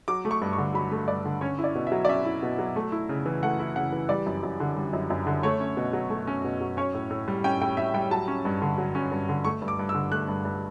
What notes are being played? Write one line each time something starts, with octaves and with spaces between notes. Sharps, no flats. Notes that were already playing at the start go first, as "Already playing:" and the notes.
F#3 D6
A3
C#6
G2
C#6
D3
F#3 B5
A3
G2 D5
D3
C#4 C#5
E4
D5
B2
E5
F#3
D5
C#4 E5
E4
B2
F#3
A3
E4
C#3
E3
A3 F#5
E4
C#3 F#5
E3
G3 D5
F#2
F#2
D3
G3
F#2
F#2
D3
A3 C#5
C#4
B2
F#3
A3
C#4
B2
F#3
C#4 C#5
A2
A2
G3
C#4 G5
A2 G5
A2 E5
G3 G5
F#3 A5
C#4
G2
D3
F#3
C#4
G2
D3
A3 C#6
G2
D6
G2
E6
D3
A3 F#6
G2
G2